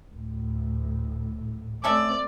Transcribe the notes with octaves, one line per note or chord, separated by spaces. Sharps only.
D2 A2
A3 C4 C#4 A4 D5 E5